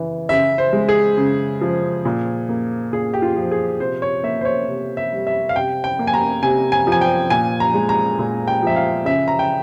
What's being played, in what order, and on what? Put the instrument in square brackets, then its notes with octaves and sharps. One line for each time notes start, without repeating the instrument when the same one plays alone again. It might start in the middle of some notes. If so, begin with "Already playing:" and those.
Already playing: [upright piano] C#3 E3
C#3 E5
C5
G#3
G#4
C#3
F3
A#2
A#3
A#2 G#4
G4
F4
F3
G#4
C3 C5
C#5
A#3 E5
C5
C#5
C3
E5
G3
E5
F5
C3 G5
G5
A#3
G#5
A#5
C3 G#5
G#5
F3 G#5
G5
A#2 G#5
A#5
G#3
A#5
A#2
G5
F3 E5
F5
C#3 E5
A#5
G5